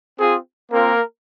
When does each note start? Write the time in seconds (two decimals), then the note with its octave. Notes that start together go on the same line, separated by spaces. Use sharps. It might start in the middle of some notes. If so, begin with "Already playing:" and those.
0.20 C4 F4 G#4
0.71 A#3 C4 F4 A#4